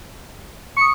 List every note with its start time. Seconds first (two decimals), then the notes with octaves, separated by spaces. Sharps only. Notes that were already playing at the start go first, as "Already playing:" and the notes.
0.77 C#6 D#6 C#7